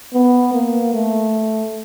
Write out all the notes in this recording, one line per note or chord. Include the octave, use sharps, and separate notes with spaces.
B3
A#3
A3